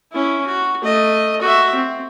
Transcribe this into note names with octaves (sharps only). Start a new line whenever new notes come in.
C#4 E4
F#4
A3 D#5
F#4 E5
C4